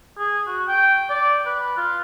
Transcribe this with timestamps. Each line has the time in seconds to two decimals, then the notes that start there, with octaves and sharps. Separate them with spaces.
0.18 G#4
0.47 F#4
0.68 G5
1.10 D5
1.46 B4
1.77 F4